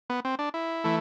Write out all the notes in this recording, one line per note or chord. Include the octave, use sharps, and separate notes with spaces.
B3
C4
D4
E4
E3 A3